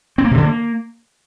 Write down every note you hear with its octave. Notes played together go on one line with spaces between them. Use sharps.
C4
A#3
C3
D3
A#3